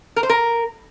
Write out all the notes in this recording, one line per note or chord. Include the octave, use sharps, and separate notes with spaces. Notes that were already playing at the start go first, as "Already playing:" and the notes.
A#4
C5
A#4